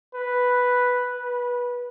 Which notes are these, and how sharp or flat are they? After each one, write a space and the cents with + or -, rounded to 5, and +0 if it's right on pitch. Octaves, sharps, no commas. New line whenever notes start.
B4 +0
B4 -20